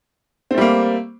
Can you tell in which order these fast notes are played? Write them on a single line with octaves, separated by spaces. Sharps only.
C4 A3 G3 A#3